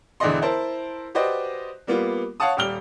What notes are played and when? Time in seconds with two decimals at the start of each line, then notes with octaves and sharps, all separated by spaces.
0.20 E1 D3 E3 D5 D#5 C6
0.42 E4 A#4 C5 A5
1.15 F#4 G4 B4 C5 D5 D#5
1.87 G3 A#3 B3 F4
2.40 C#5 F5 F#5 A5 D#6
2.57 D#1 G3 G5 F6 G7